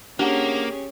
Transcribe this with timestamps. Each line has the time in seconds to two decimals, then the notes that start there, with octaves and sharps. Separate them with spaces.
0.19 A#3 C#4 D4 G4 G#4 F#5